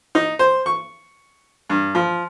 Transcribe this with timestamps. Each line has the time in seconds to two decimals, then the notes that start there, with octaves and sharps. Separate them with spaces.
0.15 D#4
0.39 C5
0.66 C#6
1.70 G2
1.95 F3